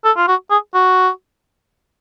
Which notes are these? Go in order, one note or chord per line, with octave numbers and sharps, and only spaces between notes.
A4
F4
F#4
G#4
F#4